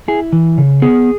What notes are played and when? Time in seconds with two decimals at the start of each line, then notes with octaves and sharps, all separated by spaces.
0.08 E4 G#4
0.33 E3
0.58 C#3
0.82 B3 G#4